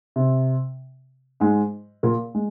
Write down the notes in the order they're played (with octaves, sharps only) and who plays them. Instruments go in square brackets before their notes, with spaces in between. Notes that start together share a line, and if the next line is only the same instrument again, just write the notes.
[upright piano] C3
G#2 G#3
A#2 A#3
G#3